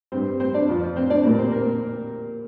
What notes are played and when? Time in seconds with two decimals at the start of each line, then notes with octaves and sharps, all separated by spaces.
0.12 G2 G3 C4 C5
0.40 C4 C5
0.54 D4 D5
0.68 F2 F3
0.96 C4 C5
1.10 D4 D5
1.24 A#2 G3 A#3 A#4
1.38 C4 C5
1.52 A#3 A#4